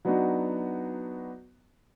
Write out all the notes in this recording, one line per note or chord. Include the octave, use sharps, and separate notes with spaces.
F#3 B3 D4 D#4 F#4